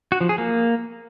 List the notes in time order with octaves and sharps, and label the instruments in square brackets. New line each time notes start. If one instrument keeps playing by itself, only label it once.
[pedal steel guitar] F#4
F3
G#4
A#3